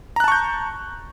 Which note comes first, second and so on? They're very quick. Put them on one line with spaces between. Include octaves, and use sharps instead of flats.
A#5 F#6 A5 C#6 G6